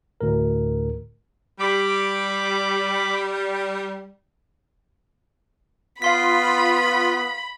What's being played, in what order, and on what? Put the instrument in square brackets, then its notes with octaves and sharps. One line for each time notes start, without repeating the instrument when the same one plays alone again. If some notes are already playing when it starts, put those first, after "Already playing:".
[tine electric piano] D2 A2 A#4
[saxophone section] G3 [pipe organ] B5 D6
[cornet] B3 [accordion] F4 [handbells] F5 C6 B6 [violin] B5